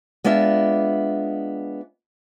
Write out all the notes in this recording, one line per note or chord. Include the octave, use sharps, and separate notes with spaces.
G#3 B3 D4 F4 E5